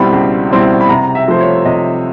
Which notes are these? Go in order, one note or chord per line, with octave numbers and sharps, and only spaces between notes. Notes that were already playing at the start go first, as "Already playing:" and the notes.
Already playing: C#2 B2 G3 C4 E4 B5
C#2
B2 G3 C4 E4
B5
C3 A#5
E5
F3 A3 C5
C#5
C3 D#5